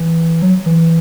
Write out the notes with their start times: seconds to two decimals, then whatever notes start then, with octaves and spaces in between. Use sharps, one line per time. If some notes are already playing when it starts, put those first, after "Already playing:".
Already playing: E3
0.42 F#3
0.66 E3